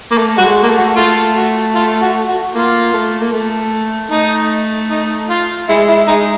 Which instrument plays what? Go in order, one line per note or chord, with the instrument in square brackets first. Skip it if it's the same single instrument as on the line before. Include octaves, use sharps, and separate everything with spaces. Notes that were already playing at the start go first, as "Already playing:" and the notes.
[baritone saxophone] A#3
A3
[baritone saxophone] G3 [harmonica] F#4
[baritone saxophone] G#3
A#3
A3
[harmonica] F#4
[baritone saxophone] A3 [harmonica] F4
[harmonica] F#4
F4
F#4
F#4
[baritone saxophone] A#3 [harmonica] F4
[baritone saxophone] A3
A#3
A3
[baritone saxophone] A3 [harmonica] D#4
[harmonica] D#4
F4
[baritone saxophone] G#3 [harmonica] E4
[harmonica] E4
[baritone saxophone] G#3 [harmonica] D#4